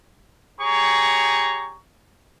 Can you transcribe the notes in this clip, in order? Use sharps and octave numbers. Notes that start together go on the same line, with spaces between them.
G4 G#4 C#5 A#5 C#6